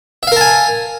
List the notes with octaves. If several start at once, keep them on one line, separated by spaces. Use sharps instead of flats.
A#4 E5 F5 G#5 A5